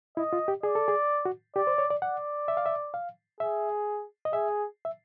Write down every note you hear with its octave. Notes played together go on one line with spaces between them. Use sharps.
E4 D#5
F4
G4
G#4 D5
A4
G#4
F#4
G4 D5
C5
C#5
D5
D5 F#5
E5
F5
E5
F5
G#4 E5
D#5
G#4 E5
E5